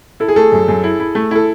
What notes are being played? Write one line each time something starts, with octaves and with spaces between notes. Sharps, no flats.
E4 A4
G#4
A3 A4
F#2
F#2
E4
E4
A3
E4 A4